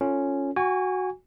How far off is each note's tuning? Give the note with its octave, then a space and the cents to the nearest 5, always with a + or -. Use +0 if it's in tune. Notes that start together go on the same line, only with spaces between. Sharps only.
C#4 +0 F4 +0 A4 +20
F#4 +0 G#5 -25 C#6 +30